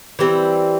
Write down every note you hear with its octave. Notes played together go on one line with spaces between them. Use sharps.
E3 G3 C4